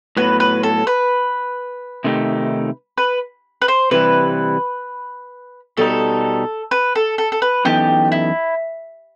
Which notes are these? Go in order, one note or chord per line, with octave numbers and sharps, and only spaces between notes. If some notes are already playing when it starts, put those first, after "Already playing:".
A2 F#3 B3 B4
B4
A4
B4
C3 D#3 A3 D#4 G4
B4
B4
C5
C3 E3 G3 B4
B2 G3 D#4 A4
B4
A4
A4
A4
B4
F#2 E3 B3 D#4 G4 A4
E4